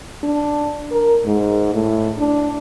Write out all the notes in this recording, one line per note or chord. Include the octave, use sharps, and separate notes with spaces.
D4
A#4
G#2
A2
D4